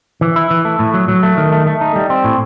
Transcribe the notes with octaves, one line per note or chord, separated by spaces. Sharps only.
E3
E4
E3
A3
A2
F#3
F#3
A3
D#3
A3
A3
D#4
G3
C4
A2